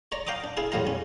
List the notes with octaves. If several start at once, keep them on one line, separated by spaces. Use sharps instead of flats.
C#5 D5 A#5
F5 G5 A#5 D6 D#6
D4
E4 G#4 F5 A5
E2 A2 G3 F5 A#5
C#4